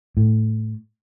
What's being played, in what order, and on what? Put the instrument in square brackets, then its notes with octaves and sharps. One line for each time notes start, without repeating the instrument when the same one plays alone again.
[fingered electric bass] A2